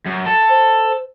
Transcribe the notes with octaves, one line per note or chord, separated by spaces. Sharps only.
F#2
A4
C5